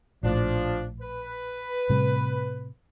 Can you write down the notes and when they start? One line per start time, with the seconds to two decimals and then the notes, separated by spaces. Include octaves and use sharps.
0.23 A#1 A2 F3 D4
1.01 B4
1.90 A2 C3 G3